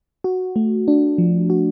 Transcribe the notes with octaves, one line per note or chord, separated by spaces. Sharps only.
F#4
A3
D4
F3
F#4